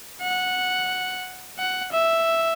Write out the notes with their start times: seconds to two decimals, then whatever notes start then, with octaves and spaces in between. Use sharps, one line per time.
0.22 F#5
1.58 F#5
1.93 E5